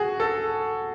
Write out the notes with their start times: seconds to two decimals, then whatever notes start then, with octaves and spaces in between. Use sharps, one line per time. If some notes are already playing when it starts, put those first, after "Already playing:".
Already playing: F#4 G#4
0.20 A4